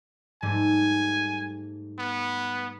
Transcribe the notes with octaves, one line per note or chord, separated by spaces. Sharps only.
G#2 G3 A3 G#5
B3